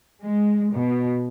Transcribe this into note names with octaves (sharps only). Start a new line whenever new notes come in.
G#3
B2